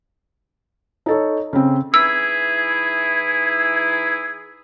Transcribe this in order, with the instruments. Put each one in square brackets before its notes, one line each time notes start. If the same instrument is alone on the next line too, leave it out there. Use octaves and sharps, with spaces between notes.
[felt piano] D#4 A4 C#5
C#3 C4
[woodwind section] E3 D#4 E4 [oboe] G#4 [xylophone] E6